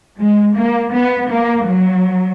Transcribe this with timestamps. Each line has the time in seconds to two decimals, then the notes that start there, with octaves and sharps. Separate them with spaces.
0.17 G#3
0.54 A#3
0.92 B3
1.29 A#3
1.66 F#3